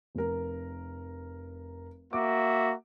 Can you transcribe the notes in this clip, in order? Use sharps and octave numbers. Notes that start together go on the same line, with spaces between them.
F1 A#4
A#3 F#4 E5 D6